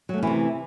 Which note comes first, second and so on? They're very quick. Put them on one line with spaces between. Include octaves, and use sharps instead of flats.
F#3 A3 C#4 E3 C3